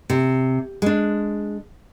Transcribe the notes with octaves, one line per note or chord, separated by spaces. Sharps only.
C3
G#3 D4